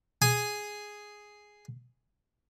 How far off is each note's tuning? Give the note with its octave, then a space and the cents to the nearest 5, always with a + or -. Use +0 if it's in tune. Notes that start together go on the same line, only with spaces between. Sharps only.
G#4 +0 G#5 +0